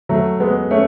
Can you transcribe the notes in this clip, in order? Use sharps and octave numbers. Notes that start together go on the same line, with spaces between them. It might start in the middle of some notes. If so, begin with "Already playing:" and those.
F#3 A3
G#3 B3
A3 C#4